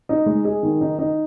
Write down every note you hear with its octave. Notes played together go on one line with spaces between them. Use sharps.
D#4
G#3
G#4
D#3
D#4
D#4